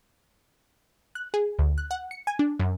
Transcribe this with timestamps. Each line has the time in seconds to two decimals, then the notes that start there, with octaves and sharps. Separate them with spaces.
1.15 F#6
1.34 G#4
1.59 D2
1.78 F#6
1.91 F#5
2.11 C#7
2.27 G#5
2.39 D4
2.59 F#2